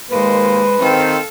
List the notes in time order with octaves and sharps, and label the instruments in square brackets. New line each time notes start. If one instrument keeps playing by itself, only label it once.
[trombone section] D#2 A#3 [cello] G#3 C5 [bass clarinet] B4
[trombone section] D#3 C4 [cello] A4 F5